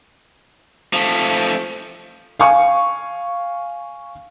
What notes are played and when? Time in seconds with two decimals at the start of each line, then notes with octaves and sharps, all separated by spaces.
0.93 F3 A3
2.39 F5 G#5 C#6